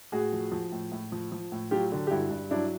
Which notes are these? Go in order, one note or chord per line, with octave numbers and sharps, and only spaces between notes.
A2 F#4 G#4
F3
F3
A2
A2
F3
F3
A2
F#3 F4 G4
D3
G4
G2 E4 F#4
G2
F#3 D4 E4